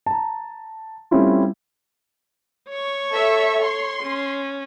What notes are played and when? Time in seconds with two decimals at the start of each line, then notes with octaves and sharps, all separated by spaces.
0.06 A5 A#5
1.11 G3 A3 C4 C#4 E4 F4
2.69 C#5 C#6
3.11 A4 E5
3.65 C6
4.02 C#4